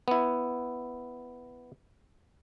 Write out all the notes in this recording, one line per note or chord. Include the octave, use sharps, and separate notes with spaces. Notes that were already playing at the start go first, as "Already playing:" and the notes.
B3 E4